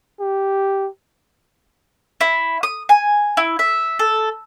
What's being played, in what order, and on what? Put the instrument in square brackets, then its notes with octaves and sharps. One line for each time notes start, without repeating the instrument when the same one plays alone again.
[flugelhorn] G4
[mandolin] E4
D#6
G#5
E4
E5
A4